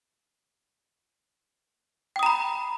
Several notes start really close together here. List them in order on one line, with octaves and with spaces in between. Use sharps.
G5 D#6 A#5 B5